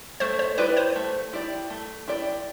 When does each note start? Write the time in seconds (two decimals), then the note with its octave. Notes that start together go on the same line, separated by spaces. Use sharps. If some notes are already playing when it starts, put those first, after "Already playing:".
0.20 A3 C5
0.39 C5
0.58 E4 G4 B4 D5
0.77 C5
0.96 A3
1.33 E4 G4 D5
1.70 A3
2.08 E4 G4 D5